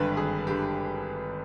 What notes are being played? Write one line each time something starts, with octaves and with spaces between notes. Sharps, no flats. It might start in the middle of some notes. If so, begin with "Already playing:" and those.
Already playing: G#1 G2 D3 B4
G#1 G#4
G2 D3 G4